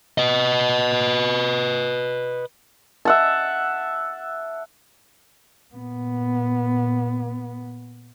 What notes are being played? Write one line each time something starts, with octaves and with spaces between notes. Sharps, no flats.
B4 D#5
E5 F#5 A5
A#2 B3